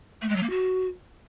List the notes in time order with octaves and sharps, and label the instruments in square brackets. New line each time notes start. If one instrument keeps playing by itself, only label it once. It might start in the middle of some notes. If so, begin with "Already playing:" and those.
[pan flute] A3
G#3
F#3
A#3
F#4